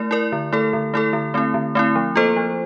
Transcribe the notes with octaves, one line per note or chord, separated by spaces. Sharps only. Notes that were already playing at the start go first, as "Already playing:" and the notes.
Already playing: A3 E4 A#4 D5
E4 A#4 D5
D3
A3 E4 A4
D3
A3 E4 A4
D3
A3 C4 E4
D3
A3 C4 E4
F3
A#3 F4 A4 C5
F3